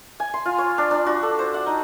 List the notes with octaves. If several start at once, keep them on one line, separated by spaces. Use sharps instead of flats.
G#5
C6
F4
C#5
D4
D4
F#4
A4
C5
F#5
D#4